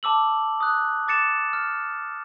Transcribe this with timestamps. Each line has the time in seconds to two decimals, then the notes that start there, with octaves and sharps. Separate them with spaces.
0.03 A5 D6 E6 F#7
0.60 D#6 F#6
1.08 D6 A6 C#7 E7
1.53 F6